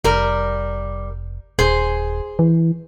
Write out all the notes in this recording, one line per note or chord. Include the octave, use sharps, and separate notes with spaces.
F1 G3 A#4
D#1 G#4 C5
E3